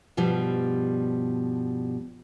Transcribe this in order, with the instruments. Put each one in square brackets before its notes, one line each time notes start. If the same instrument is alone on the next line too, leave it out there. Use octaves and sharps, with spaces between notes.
[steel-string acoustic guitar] G2 B2 F3 G3